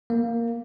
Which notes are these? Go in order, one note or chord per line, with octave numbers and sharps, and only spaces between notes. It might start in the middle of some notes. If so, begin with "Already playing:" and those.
A#3